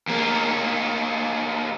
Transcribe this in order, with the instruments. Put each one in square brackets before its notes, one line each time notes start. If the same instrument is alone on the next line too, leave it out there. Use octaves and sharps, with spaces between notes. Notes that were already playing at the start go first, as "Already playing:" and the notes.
[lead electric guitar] E2 A#3